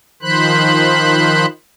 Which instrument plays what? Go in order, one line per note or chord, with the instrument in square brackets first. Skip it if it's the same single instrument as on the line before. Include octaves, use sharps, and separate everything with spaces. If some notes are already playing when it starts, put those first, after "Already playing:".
[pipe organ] D#3 F3 C5 B5 F#6